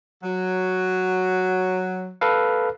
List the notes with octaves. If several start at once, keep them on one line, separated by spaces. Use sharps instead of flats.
F#3
A4 B4 F5